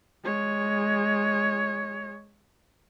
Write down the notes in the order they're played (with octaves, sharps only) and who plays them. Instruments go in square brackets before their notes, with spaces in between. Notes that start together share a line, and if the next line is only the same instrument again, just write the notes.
[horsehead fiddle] G#3 C#5